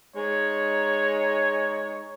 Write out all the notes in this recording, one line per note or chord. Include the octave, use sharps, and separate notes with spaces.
G#3 D#4 C#5